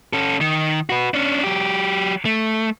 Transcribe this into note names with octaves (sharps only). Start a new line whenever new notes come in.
C#4 A4
D#3
F#4 B4
C#4 D4
F#3 G4
A3